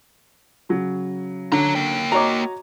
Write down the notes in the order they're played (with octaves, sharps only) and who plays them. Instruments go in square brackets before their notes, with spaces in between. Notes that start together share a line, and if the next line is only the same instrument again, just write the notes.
[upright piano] C#3 F#3
[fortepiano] D3 [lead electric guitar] C#5 A#5
[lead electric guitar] A#3 G5
[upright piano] F#4 C#5 D#5 [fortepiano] A#5 D6